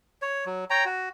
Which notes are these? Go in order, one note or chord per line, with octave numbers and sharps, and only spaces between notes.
C#5
F#3
C#5 G5 A#5
F#4